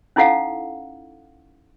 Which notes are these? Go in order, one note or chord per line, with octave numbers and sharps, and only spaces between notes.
C#4 D#4 E4 A4 F5 F#5